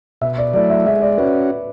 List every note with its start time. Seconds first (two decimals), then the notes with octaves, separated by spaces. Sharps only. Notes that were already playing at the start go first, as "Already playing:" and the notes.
0.21 B2 E5
0.38 D5
0.53 F#3 A3 E4 D5
0.70 E5
0.86 G#3 E5
1.02 D5
1.18 C#4 F#4 B4